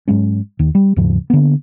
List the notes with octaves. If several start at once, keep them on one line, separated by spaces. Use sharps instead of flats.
G#2 F#3 G#3 C#4
D#2 D#3
G3
D#2 G#2 C#3 F3
D3 F#3 A#3 B3